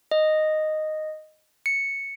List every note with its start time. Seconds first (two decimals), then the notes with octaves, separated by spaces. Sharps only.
0.11 D#5
1.66 C#7